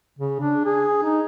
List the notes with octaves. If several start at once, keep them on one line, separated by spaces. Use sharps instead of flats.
C#3
D4
G#4
D#4